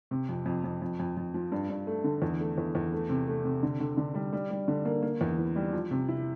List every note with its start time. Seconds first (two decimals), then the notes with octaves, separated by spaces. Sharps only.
0.11 C3
0.29 F2
0.46 F2
0.64 F2
0.82 F2
1.00 F2
1.17 F2
1.34 F3
1.52 G2
1.70 G2
1.87 A3
2.04 D3
2.22 E2
2.40 A3
2.58 E2
2.75 E2
2.93 A3
3.09 C3
3.27 A3
3.44 C3
3.63 D3
3.80 D3
3.97 D3
4.15 G3
4.33 G3
4.50 G3
4.68 D3
4.85 A#3
5.02 A#3
5.21 E2
5.38 E3
5.56 G3
5.73 F3
5.91 C3
6.08 E4